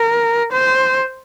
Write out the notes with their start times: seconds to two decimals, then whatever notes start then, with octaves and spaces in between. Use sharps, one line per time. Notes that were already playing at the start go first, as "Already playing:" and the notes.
Already playing: A#4
0.53 C5